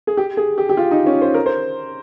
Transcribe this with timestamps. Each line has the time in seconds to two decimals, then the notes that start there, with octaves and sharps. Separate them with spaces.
0.07 G#4
0.17 G4
0.37 G#4
0.58 G4
0.69 G4
0.77 F4
0.91 D#4
1.07 C#4
1.21 C5
1.34 A#4
1.46 C5